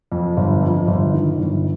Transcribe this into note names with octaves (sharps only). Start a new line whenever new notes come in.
F2
G1
F2
G1
D#3
G1